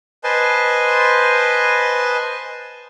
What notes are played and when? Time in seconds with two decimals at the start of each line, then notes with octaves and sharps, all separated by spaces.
0.24 B4 C5 D#5 G#5 A5 C6